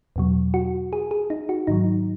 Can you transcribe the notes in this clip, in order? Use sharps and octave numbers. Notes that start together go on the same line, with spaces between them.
E2 B2 F#3
F#4
G#4
G#4
D#4
F#4
G#2 D#3 F#3 D#4